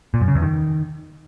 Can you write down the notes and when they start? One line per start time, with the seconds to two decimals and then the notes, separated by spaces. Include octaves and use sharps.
0.14 A#2
0.21 F#2
0.28 C#3
0.35 E2
0.42 D#3